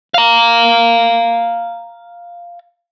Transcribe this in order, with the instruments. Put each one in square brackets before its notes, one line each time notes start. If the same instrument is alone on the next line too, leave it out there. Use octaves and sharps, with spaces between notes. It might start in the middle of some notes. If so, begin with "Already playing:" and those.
[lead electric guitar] F5 A#5